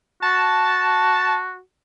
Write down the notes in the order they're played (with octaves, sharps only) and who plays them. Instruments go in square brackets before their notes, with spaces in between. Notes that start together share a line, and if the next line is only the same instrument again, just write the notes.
[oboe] F#4 [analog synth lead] A5